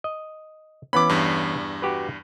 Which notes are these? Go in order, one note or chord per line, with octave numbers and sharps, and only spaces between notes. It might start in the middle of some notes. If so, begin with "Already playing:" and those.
D#5
E3 B3 C#4 B5 D6
E2 G2
F#4 G4 B4